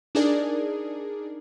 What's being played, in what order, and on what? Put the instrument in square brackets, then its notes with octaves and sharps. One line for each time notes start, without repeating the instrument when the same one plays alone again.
[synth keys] D4 D#4 G#4 A#4 D5